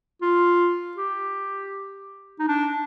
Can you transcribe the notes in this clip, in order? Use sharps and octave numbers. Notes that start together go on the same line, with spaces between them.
F4
G4
D#4
D4